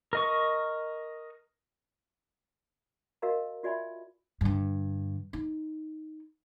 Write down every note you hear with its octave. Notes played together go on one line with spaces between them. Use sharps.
A#4 D#5 C#6
F#4 A#4 D#5 F5 A#5
F4 F#4 D5 E5 G#5 B5
G2 D3
D#4